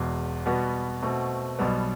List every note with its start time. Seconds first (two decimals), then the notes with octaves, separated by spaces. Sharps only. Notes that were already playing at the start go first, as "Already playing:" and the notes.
Already playing: E1 E2 B2
0.46 B2 G3 B3 F#4 B4
1.02 B2 A3 C4 F#4
1.59 B1 B2 G3 B3